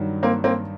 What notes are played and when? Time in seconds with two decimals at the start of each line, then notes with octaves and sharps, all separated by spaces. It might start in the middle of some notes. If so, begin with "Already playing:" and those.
Already playing: G2 D#3 F#3
0.23 A#3 C4
0.44 A#3 C4